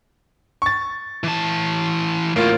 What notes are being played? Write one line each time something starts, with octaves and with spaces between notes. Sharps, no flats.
C#6 A6
E3 A5
D2 A2 A#3 F4